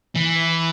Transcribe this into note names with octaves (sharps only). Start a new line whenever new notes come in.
E3